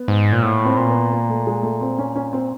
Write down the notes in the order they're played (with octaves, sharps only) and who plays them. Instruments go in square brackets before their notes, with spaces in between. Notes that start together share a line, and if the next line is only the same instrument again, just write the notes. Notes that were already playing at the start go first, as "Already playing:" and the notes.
Already playing: [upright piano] B3
[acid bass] G#2
A#2
[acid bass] A2 [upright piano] A#3
[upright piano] C4
[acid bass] A#2
[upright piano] B3
A#3
A3
G#3
A3
C4
C#4
C#4
C4